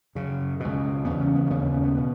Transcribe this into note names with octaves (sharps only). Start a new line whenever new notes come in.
F#2 C#3
C#2 B2
E2 C#3 B3
C#4
B3
A#3
D#2 C#3 B3
C#4
B3
B3
B2 B3